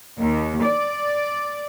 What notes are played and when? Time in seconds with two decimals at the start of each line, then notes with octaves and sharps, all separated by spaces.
0.19 D#2
0.65 D5